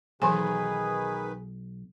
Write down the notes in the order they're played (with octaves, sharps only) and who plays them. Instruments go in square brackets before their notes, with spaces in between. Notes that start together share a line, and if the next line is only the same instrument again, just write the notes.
[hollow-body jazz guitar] B1 [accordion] D#3 B4 [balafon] E3 F#3 G#5 [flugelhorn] G#4